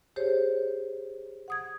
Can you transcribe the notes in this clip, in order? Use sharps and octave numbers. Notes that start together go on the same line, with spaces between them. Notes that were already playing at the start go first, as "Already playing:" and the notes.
G4 G#4 C5 C#5
F#5 D#6 G#6